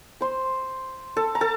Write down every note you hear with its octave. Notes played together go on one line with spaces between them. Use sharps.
C5 C6
A4 A5
A#5
A4 A5